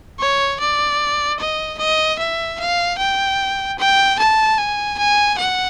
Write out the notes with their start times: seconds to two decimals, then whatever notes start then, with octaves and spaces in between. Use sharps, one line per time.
0.20 C#5
0.60 D5
1.40 D#5
1.79 D#5
2.19 E5
2.60 F5
2.99 G5
3.79 G5
4.19 A5
4.58 G#5
4.99 G#5
5.39 F#5